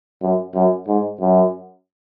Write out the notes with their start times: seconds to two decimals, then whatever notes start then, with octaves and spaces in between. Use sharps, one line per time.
0.22 F#2
0.55 F#2
0.87 G#2
1.21 F#2